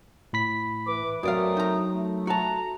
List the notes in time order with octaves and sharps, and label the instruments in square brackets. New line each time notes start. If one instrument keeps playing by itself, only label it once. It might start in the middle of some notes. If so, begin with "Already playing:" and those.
[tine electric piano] A2 B5 B6
[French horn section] E3 B4 [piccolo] D6
[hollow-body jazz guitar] F#2 D5 F5 [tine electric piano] F#3 [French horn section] A3 C4 A#4 [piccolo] D#6
[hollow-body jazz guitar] D#4 A#5
[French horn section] A3
[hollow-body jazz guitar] F#4 A5 [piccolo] A#5